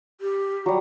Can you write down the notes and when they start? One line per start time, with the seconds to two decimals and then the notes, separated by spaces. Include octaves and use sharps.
0.21 G4
0.66 F#3 G3